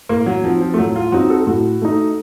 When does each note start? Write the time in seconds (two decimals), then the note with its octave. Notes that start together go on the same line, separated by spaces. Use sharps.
0.09 A2 A#3
0.26 F#3
0.44 F3 F#3 C4 D#4
0.61 F3
0.74 A3
0.78 A2 F#3
0.96 F4
1.12 F#3 C4 D#4 F#4
1.30 A4
1.47 A2 F#4
1.82 A3 D#4